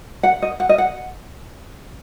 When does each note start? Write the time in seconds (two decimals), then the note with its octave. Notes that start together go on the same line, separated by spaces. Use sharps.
0.23 F#5
0.42 D#5
0.60 F#5
0.69 D#5
0.78 F#5